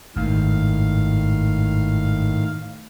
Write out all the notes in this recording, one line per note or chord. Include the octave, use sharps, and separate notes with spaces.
G#1 F#2 A2 D#3 F5